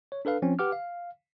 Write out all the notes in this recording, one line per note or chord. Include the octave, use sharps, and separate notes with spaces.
C#5
D4 A4 B4 F5
F3 C4 C#4
G4 B4 F#5 D6 F6
F5